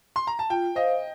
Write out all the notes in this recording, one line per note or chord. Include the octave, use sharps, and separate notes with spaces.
C6
A#5
A5
F4 G5
C5 D#5 F5